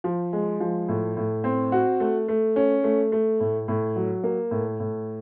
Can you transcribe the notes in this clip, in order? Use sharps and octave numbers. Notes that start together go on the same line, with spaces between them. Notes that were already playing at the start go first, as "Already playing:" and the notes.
F3
G#3
F3
A2
A2
C4
F#4
A3
A3
C#4
A3
A3
A2
A2
F#3
A#3
A2
A2